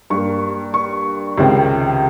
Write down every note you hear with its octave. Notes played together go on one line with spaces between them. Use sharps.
G2 G3 A#3 C#6
C#6
C#2 C3 D#3 G#3 C4